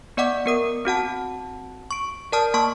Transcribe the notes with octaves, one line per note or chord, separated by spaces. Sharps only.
B3 D5 D#5 F#5 D6
B3 A#4 D#6
C4 F#4 F#5 A5
C#6 D7
A#4 D5 A5 D#6 F6
A#3 A5 C#6